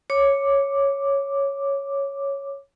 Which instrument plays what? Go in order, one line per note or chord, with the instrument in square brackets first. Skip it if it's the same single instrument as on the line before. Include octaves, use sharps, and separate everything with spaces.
[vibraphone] C#5 D6